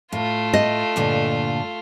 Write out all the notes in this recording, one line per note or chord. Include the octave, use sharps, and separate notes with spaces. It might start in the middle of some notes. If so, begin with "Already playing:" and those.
A2 A3 F4
D#5
G2 A#2 D3